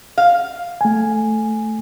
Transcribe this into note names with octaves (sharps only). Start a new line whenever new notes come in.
F5
A3 G#5